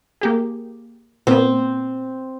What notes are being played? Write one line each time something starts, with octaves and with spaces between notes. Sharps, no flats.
A#3 G4 G#4
A#2 B3 C4